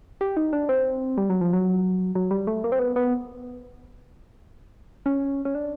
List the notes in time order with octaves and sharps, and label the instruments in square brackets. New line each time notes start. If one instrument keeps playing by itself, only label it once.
[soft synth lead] G4
D#4
D4
C4
G3
F#3
F3
F#3
F#3
G3
A3
A#3
C4
B3
B3
C#4
C#4
D4